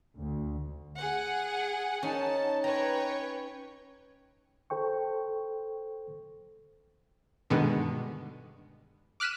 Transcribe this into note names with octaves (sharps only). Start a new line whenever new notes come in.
D2
G#4 F#5
C#4 D#4 A5
B4 C#5 G5 A#5
A4 C5 G5 C#6
G2 B2 D3 D#3 G#3 B3
D6 F6 F#6 B6 D#7 E7